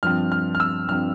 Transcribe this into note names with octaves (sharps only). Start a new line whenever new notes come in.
G2 F3 C4 F6
F6
F6
E6
G2 F3 C4 F6